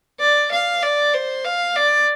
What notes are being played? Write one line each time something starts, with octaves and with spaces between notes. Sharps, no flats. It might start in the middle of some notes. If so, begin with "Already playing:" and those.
D5
F5
D5
C5
F5
D5